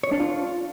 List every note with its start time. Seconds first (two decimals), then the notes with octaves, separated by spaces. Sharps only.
0.03 C#5
0.12 D4
0.20 F4